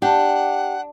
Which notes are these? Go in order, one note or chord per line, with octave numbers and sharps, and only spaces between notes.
D4 G4 F#5